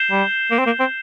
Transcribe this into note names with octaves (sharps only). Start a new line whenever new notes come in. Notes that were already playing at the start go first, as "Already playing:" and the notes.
Already playing: G6 C7 E7 G7
G3
A#3
C4
A#3
C4